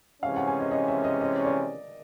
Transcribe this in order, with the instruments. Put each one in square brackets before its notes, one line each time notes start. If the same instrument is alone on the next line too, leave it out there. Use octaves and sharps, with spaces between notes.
[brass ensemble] C3 E3 G#3 C#4 [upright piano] F5
[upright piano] F#5
G#5
D#5
D#5
E5
D#5
D#5
D5